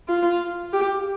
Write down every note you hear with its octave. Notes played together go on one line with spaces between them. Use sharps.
F4
G4